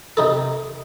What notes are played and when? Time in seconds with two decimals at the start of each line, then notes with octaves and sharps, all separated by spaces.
0.17 C3 D#4 A4